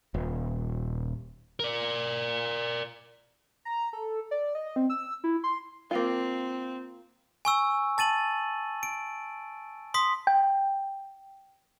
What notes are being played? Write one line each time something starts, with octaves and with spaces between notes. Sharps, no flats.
D#1
A#4 D5
A#5
A4
D5
D#5
C4
E6
E4
C6
A#3 C4 F4
G#5 C#6 E6
A5 A6 D#7 F#7
D7
C6 D#6 B6
G5